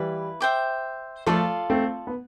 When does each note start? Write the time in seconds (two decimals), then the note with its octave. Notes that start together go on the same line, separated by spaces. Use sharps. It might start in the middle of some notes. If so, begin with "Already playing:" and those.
Already playing: E3 G3 E4 B4 F5
0.40 C5 E5 G5 D6
1.26 F3 A3 F4 A4 D5 F5
1.70 A3 C4
2.07 B3